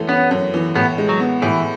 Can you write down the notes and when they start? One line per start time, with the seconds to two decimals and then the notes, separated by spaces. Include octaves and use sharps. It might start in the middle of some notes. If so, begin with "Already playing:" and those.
Already playing: F#2 E3 A3
0.09 B3 C#4
0.31 F#2
0.54 E3
0.75 A2 B3
0.98 G#3
1.09 F#3
1.20 B3
1.42 A2 E3